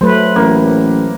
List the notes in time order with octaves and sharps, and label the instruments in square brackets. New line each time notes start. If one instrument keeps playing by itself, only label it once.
[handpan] F#3 A3 B4 [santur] C5
[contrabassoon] A1 [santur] A#3